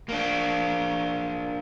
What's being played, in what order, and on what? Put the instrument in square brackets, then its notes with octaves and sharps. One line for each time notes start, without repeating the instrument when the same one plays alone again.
[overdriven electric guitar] A#3 D4